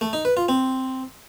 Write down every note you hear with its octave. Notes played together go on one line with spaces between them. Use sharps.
A3
D#4
B4
F4
C4